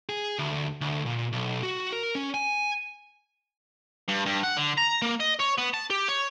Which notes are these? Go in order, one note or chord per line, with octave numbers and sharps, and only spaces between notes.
G#4
D2
D2
A#2
B1
F#4
A#4
C#4
G#5
G2
G2
F#5
D3
A#5
A#3
D#5
C#5
B3
A5
G4
C#5